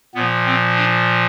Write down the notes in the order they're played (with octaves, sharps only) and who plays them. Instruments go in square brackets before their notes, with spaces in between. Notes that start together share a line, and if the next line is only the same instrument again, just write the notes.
[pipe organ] A#2 F3 B3
C4
D4